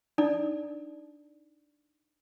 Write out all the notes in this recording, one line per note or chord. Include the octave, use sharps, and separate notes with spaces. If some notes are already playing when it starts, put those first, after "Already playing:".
D4 D#4 D5